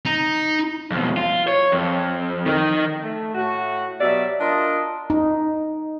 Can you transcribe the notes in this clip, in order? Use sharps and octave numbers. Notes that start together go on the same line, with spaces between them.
D#4
F2 B2
F4
C#5
F2
D#3 D#4
A3
A2 F#4
B2 F#3 G3 D5 E5
D4 F4 A#4 D#5
D#4